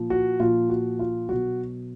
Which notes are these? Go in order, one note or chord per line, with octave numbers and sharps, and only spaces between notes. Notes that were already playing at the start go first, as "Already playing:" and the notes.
Already playing: A#2 F3
F#4
A#2 F3 F4
F#4
F4
B2 F#3 F#4